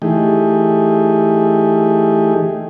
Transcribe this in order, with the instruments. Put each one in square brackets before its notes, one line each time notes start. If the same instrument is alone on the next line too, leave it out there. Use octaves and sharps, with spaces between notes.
[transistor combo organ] E3 A3 D#4 G4 G#4